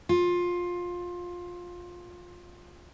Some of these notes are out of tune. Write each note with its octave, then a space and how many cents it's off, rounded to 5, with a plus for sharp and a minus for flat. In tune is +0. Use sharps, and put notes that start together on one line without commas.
F4 +15